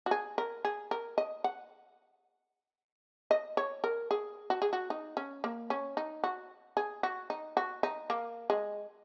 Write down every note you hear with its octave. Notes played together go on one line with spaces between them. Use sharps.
F#4
G#4
A#4
G#4
A#4
D#5
F#5
D#5
C#5
A#4
G#4
F#4
G#4
F#4
D#4
C#4
A#3
C#4
D#4
F#4
G#4
F#4
D#4
F#4
D#4
A#3
G#3